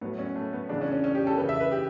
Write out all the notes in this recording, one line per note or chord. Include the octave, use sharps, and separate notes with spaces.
A2 F#3 B3
C#4
A3
B3
C#3 E3 D4
C#4
C#4
C#4
G4
A4
C#3 E3 B4
E5
B4
G4